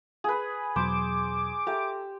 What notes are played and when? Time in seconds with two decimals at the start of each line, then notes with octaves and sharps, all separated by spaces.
0.24 G#4 B4
0.76 E2 B2 F#3 C5 D6
1.67 G4 A4 E5 A#5